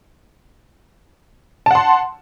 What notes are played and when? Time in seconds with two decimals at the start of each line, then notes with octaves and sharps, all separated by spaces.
1.66 A5
1.71 F#5
1.75 C6